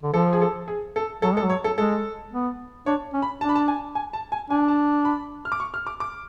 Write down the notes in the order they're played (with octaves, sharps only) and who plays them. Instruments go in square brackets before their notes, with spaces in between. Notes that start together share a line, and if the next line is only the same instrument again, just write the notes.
[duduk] D3
[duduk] F3 [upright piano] A4
[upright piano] G#4
A4
G#4
A4
[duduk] F#3 [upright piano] A4
[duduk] G#3 [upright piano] A4
[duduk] F#3
[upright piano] C#5
A4
[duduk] G#3 [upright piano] A4
[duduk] B3
[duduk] D4 [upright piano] C#5
[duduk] C#4
[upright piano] B5
[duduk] D4 [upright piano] A5
[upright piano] B5
A5
G#5
G#5
A5
G#5
[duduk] D4 [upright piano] G#5
[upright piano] A5
B5
F6
D6
C#6
F6
D6
D6